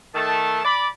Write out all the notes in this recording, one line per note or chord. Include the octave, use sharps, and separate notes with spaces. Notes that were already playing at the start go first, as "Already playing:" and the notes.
D#3 A3 A5
D5 B5